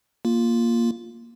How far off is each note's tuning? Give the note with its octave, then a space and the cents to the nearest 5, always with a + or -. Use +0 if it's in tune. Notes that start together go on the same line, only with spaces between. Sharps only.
A#3 +5 F4 +0